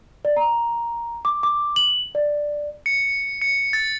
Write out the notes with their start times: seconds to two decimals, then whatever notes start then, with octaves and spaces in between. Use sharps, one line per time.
0.25 D5
0.37 A#5
1.25 D6
1.43 D6
1.76 F#7
2.15 D5
2.86 C#7
3.41 C#7
3.73 A6